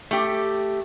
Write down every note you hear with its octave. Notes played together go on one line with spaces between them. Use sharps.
A3 G4